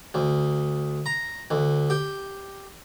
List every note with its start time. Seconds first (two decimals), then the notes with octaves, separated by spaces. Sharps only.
0.14 D2
1.06 A#5
1.51 D2
1.90 G4